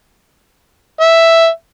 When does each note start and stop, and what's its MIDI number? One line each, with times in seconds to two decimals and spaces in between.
1.01 1.48 76